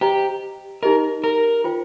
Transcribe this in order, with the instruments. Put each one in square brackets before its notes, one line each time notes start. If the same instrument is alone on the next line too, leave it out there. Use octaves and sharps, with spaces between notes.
[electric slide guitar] G4 [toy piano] C5 D#5 A#5
[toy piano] D#4 G4 D#5 [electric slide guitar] A#4
[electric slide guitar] A#4
[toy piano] F4 C5 G5